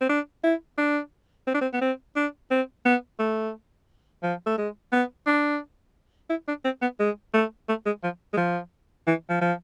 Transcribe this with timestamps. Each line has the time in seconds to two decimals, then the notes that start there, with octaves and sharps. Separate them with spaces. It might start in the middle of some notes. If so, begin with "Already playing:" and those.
0.01 C4
0.09 D4
0.43 E4
0.78 D4
1.47 C4
1.54 D4
1.61 C4
1.73 B3
1.81 C4
2.16 D4
2.51 C4
2.85 B3
3.19 A3
4.23 F3
4.46 A3
4.57 G#3
4.92 B3
5.26 D4
6.30 E4
6.48 D4
6.64 C4
6.82 B3
6.99 G#3
7.34 A3
7.69 A3
7.86 G#3
8.03 F3
8.33 G#3
8.37 F3
9.07 E3
9.29 F3
9.41 F3